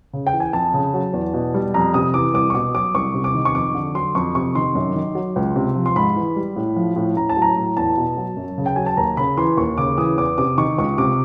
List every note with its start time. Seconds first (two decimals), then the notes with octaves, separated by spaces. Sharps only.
0.13 C#3
0.27 G5
0.33 E3
0.40 G#5
0.53 F2 A5
0.73 C#3
0.94 F#3
1.13 E2
1.34 B2
1.54 G3
1.74 F2 A#5
1.94 C3 D#6
2.14 E3 D6
2.34 C2 D6
2.50 C#6
2.54 B2 D6
2.75 F#3 D6
2.95 C2 C#6
3.14 C3
3.24 D6
3.34 D#3
3.45 C#6
3.55 F2 D6
3.75 D3
3.95 F#3 C6
4.15 F2 C#6
4.35 C3 C#6
4.55 D#3 C6
4.75 F#2
4.95 D#3
5.15 F#3
5.36 C#2
5.56 C3
5.76 F3
5.86 C6
5.96 G#2 B5
6.16 E3
6.36 G3
6.56 A2
6.76 F3
6.96 A2
7.16 A2 A#5
7.29 A5
7.37 F#3
7.42 A#5
7.57 A2
7.77 E2 A5
7.97 B2
8.17 F#3
8.37 F#2
8.58 C#3
8.66 G5
8.76 F#3 G#5
8.86 A5
8.97 D#2 A#5
9.17 C#3 B5
9.37 E3 C6
9.57 D#2 C#6
9.78 C#3 D6
9.98 E3 D#6
10.18 E2 D6
10.38 C3 D6
10.58 D#3 C#6
10.78 C#2 C#6
10.98 C3 D6